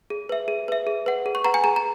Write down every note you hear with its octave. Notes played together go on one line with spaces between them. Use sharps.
G#4
B4 E5
G#4
B4 E5
G#4
B4 F#5
G#4
C#6
B4 F#5 A#5
G#5
G#4 A#5
A#5